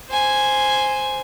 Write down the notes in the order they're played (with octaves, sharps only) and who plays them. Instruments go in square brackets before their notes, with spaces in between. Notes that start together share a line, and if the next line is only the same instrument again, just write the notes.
[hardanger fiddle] C5 G#5